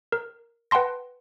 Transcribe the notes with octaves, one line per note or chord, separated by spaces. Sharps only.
A#4
B4 F#5 G5 A5 C6 A#6